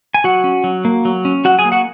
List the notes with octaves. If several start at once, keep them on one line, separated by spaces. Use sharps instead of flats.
G#5
F#3 F#4 F#5
C#4
F#3
A#3
F#3
C#4
F#3 F#4 F#5
G#4 G#5
A#3
F#4 F#5